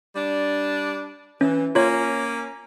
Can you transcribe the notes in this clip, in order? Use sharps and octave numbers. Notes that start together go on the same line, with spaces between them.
G3 D4
E3 C#4
A#3 C#4 F4 C#5